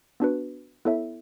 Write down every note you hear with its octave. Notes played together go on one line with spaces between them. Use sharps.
B3 D4 F#4 B4
B3 E4 A4 C#5 E5